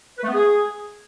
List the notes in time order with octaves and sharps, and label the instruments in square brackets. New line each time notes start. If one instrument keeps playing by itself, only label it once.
[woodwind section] B4
A3
B3
G#4